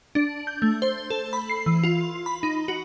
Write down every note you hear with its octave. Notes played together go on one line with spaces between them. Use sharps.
D4
G6
A3
C5
A4
B5
C7
E3
F4
B5
D#4
F#4